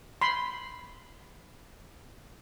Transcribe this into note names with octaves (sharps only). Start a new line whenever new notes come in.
B5 C6